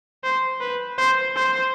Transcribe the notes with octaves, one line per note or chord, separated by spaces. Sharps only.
C5
B4
C5
C5